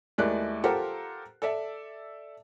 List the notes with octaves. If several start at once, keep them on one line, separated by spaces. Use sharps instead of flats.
D#2 G#3 A3 E4 D5 F#6
F4 G4 A4 A#4 C5 F#5
A4 D5 E5